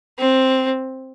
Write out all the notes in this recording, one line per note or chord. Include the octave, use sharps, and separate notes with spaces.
C4